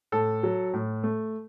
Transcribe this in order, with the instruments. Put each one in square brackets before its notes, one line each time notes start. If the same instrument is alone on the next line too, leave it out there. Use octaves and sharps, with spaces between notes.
[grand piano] A2 A4
F#3
A2
A3